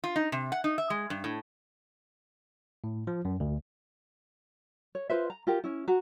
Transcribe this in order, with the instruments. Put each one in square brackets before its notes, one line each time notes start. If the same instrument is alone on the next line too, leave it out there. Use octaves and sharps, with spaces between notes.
[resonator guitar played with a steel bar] F4
D#4
C3
F#5
D#4
E5
G#3
G2
A2
[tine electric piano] A2
F3
F#2
D2
[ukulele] C#5
F4 B4 C5 E5
A#5
F4 G4 A#4
C#4 E4
F#4 A#5